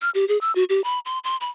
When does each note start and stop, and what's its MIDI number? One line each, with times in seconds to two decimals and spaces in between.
0.02 0.10 89
0.15 0.27 67
0.28 0.40 68
0.41 0.54 88
0.55 0.64 66
0.69 0.83 67
0.84 0.99 83
1.05 1.19 84
1.24 1.37 84
1.41 1.50 83